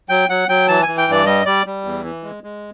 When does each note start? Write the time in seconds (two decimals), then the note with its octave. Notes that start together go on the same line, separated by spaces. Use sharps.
0.09 F#3 G5
0.29 F#3 F#5
0.49 F#3 G5
0.68 E3 A5
0.83 E3 G#5
0.98 G5
1.08 G2 D5
1.26 G3 D#5
1.45 G3 D5
1.66 G3
1.84 E2
2.04 E3
2.23 G#3
2.44 G#3